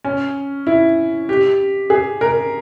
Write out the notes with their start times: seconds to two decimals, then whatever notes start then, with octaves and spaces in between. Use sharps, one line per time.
0.04 C#4
0.67 E4
1.29 G4
1.90 G#4
2.21 A#4